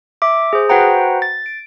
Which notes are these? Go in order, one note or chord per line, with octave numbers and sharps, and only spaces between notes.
E5 D6
G#4 C5
F#4 B4 C5 F#5 G5 A#5
A6
D7